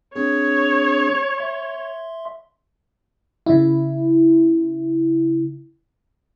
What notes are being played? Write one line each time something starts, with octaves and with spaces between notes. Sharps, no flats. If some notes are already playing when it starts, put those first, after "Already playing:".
C4 D4 G#4 C#5
E5 C6
C#3 E4